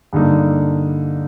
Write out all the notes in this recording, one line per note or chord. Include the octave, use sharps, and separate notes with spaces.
G2 D3 G3 A#3 D#4